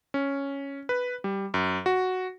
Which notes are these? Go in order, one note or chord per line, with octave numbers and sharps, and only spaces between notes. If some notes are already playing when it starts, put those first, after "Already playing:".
C#4
B4
G3
F#2
F#4